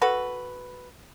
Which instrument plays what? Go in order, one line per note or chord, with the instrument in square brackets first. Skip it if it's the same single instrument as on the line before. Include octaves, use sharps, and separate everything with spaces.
[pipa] F#4 A4 B4